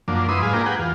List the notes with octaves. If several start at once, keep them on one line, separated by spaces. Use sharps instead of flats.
F#2 F3 A#3 D4
F#2 E4 B4 C6 D#6
G#2 G#4 B4 F5
A#3 D4 F4 G4 A#4
G#4 B4 F#5 G5
E2 F4